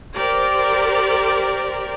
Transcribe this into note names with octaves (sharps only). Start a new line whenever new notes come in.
G4 A#4 C5 D5